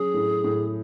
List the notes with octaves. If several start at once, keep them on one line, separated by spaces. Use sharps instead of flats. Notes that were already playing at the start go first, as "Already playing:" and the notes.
Already playing: F#3 C#4 G#4
A2
A2